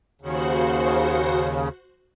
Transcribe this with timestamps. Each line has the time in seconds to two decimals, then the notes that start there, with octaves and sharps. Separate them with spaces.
0.21 D#2 C#3 F#4 C5 F#5